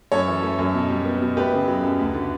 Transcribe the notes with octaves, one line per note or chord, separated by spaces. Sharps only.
F#2 A4 C#5
E3
A3
F#2
B2
G3
B3
B2
A3 G4 B4
C#3
F#3
F#2
D2
D3